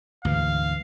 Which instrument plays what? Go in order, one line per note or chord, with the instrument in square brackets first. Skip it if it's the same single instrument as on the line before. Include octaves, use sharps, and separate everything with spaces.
[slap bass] D2 G#2 E3 [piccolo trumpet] F5